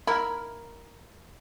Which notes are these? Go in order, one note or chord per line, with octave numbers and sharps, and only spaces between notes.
E4 A#4